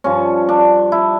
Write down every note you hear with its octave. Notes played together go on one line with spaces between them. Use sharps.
G2 F3 C#4
D4
E4